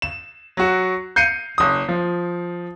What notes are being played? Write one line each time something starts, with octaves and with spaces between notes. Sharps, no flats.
E7
F#3 F#4
G6 C7 C#7 D#7
F#1 D#6
F3